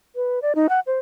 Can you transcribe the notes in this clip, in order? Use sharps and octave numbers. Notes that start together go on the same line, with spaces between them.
B4
D5
D#4
F#5
C5